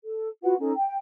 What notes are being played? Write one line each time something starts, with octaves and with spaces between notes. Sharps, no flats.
A4
F4 F#4 B4 F#5
C#4 D#4 A4
G5